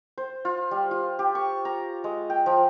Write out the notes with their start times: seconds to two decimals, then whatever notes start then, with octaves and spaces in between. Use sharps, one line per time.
0.18 C5
0.45 F4
0.71 G3
0.91 F4
1.19 G4
1.35 C#6
1.65 A#5
2.04 G#3
2.30 G5
2.46 F3